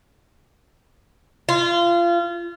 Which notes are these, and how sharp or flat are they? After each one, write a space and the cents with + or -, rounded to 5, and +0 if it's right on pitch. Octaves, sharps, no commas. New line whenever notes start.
F4 -25